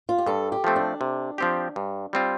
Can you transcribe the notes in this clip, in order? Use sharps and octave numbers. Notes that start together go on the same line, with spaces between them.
F4
G4
G2 A4
G4
F3 A3 C4
D4
C3
F3 C4 G4
G2
G3 C4 F4